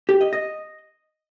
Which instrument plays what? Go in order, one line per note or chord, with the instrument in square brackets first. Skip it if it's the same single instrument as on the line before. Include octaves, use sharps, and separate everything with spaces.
[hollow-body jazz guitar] G4
D#5
D#5